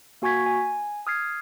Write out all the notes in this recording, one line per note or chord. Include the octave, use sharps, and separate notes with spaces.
A#3 F#4 G#5 C#6 G#6 B6
G#5
D#6 F6 G#6 C7